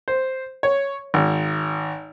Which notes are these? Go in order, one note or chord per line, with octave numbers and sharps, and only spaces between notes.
C5
C#5
G#1